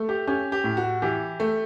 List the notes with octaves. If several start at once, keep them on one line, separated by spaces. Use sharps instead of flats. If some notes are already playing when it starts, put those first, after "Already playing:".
Already playing: A3
G4
C#4 G4
G4
A2
F#4
E3 G4
A3